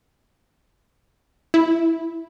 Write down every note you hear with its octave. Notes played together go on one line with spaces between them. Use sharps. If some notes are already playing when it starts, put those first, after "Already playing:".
E4